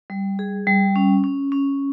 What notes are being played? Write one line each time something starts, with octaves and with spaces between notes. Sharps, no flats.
G3
G#4
G3
C#4
C#4
C#4